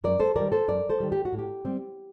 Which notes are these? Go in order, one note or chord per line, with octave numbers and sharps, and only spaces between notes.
F#2 A#4 D5
A4 C5
D#3 G3 A#4 D5
A4 C5
F#2 A#4 D5
A4 C5
D#3 G3
G4
F#4
A2
G4
G3 C4